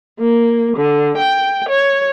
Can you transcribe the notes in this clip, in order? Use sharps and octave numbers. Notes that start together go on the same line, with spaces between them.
A#3
D3
G5
C#5